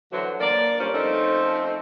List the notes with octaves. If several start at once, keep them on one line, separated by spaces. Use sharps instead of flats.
D3 E3 F#3 F#4 C5
A#3 D5
G2 A#3 C#4 F4 C5
F3 A3 C4 C#4 D#4